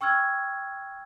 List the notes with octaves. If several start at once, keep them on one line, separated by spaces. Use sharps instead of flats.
G5 C#6 E6 F6 G#6